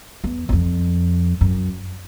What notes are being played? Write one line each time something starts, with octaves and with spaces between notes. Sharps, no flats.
E2
E2
F2
F#2